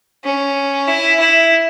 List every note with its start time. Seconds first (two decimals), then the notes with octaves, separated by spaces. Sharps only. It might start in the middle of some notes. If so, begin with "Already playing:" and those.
0.24 C#4
0.88 E4
1.20 E4